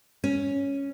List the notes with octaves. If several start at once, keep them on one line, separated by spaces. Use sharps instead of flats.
C#4